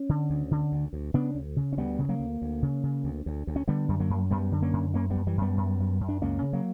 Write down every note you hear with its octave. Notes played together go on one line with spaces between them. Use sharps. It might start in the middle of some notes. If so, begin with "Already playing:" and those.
Already playing: C#4
D3
D2
D3
D2
D2
C#3 B3 D4
D2
C#3
C#4
D2 G3 B3
C#3
F#3 A#3
D2
D2
C#3
C#3
D2
D2
D2
C#4
D3 G3 B3
F#2 G3
F#3 A#3
F#2
F#2 G3 B3
D3
A#3 C#4
F#2
F#2 A#3 C#4
G3 B3
F#2
E3 G3
F#2 G3 B3
F#2
F#2
F#2
D4
C#2 A#3 C#4
C#3
F#3 A#3